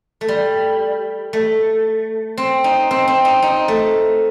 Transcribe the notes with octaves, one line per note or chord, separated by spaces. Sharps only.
A3
G3
A3
C4
D#4
C4
C4
D#4
D#4
A3